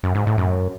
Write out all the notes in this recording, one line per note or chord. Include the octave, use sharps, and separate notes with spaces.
F#2
G#2
A2
F#2